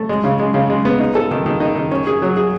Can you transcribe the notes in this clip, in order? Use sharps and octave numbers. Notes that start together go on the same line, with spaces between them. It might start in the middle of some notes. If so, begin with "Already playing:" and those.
Already playing: A3
G#3
C#3
G#3
C#3
G#3
B3
D#4
A4
D#3
D#3
D#4
D#3
C#4
G#4
F#3
G#4